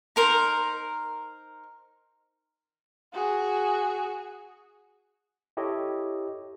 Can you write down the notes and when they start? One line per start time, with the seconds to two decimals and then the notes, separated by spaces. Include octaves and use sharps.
0.16 D#4 A#4 C5
3.13 F#4 G#4
5.57 E4 G4 A4 C#5 D#5